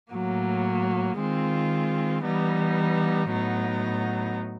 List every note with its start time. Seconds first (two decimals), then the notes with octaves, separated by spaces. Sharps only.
0.12 A2 F#3 A#3
1.19 D#3 G#3 C4 F4
2.24 E3 G3 B3 D#4
3.30 A2 F#3 B3 D#4